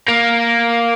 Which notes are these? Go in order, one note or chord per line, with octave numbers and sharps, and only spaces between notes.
A#3